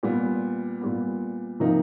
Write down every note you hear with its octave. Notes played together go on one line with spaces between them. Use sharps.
A#2 G3 B3
A#2 G3 B3
C3 F3 A#3 D#4